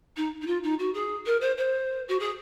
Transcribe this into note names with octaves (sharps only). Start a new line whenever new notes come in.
D#4
D#4
F4
D#4
F#4
G#4
A#4
C5
C5
F#4
G#4